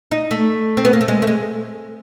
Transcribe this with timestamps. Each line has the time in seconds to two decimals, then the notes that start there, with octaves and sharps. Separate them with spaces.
0.11 D#4
0.31 A3
0.77 C4
0.85 B3
0.93 A#3
1.01 A3
1.08 G#3
1.22 A3
1.27 G#3